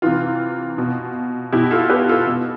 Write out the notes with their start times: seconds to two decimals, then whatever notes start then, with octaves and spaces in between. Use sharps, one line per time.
0.02 C3 E3 F4
0.78 B2
1.52 B2 E4 G4
1.71 F4 A4
1.90 G4 B4
2.09 F4 A4
2.27 B2